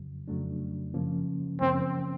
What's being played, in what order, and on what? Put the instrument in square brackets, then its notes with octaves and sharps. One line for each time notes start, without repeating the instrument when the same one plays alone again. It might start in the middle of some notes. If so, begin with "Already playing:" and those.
Already playing: [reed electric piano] F2 C#3 F#3
F2 C#3 F#3 A3 D4
F#2 C#3 F3 A#3 C#4
[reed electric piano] F#2 C#3 F3 A#3 C#4 [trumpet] C4